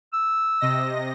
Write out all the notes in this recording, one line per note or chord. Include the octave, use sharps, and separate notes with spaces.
E6
C3 D#5 A#6